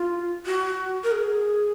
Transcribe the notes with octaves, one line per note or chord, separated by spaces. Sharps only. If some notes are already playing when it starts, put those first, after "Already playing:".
Already playing: F4
F#4
A#4
G#4